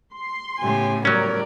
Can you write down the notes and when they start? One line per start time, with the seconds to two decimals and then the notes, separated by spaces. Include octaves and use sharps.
0.14 C6
0.60 A2 C#3 B3 G4 G#5
1.05 F#3 G3 C#4 A#4 D5